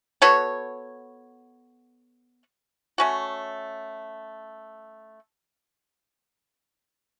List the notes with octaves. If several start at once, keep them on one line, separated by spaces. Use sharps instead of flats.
B3 F#4 A4 C#5
A3 C#4 F#4